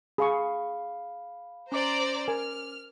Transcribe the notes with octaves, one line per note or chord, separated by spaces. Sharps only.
G#4 F5 B5 C#6
C#4 C5 D5 A#5 D6
A#4 G#5 F6